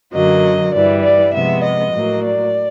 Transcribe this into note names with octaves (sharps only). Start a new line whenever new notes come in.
F#2 D3 F#3 A#3 D#5
G2 E3 G3 D5
D5
C3 F3 G#3 B3 E5
D#5
A2 F#3 A#3
D5